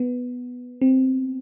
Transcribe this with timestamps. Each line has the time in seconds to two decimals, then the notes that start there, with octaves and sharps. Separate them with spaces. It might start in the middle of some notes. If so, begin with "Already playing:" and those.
Already playing: B3
0.82 C4